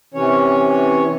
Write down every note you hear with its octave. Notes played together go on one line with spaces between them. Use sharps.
C3 E3 C#4 C#5